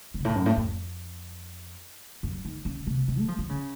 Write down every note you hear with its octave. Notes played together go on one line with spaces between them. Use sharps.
C#3
F#2
A2
F#2
A2
F2
F#2
D#3
C#3
C3
C3
A3
F3
F3
C#3